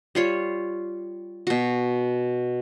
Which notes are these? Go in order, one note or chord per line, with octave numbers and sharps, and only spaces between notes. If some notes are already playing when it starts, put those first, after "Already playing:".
G3 F4 C#5
B2 F#4